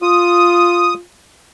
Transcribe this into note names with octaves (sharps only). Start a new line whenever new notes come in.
F4 D#6